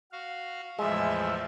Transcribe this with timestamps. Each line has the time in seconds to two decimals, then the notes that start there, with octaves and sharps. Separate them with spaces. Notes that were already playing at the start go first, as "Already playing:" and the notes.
0.12 F#4 F5
0.79 E2 A2 F3 G#3 E5